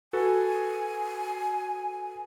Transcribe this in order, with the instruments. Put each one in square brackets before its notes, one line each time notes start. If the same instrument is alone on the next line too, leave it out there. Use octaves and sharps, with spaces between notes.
[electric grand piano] F#4 A4 B4 [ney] G#5